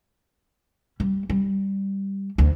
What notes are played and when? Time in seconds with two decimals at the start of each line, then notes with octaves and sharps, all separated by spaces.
1.00 G3
1.30 G3
2.38 D2